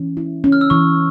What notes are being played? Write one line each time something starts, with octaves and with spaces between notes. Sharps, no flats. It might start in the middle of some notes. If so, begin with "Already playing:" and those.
Already playing: E3 C#4
E4
C#4
F6
E6
E3 C#6